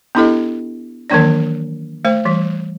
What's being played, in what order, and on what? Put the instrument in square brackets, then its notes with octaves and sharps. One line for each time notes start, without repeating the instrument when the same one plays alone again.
[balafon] B3 D4 E4 G4 A4 D#5
D#3 E3 F#3 A#3 D4 D5
A3 C5 G5
E3 G3